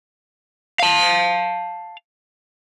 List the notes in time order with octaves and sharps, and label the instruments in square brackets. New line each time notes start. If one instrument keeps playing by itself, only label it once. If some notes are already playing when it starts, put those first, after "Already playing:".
[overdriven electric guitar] F5 A5